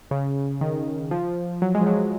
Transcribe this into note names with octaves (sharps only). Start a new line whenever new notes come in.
C#3
D#3
F3
F#3
G#3
F3
F#3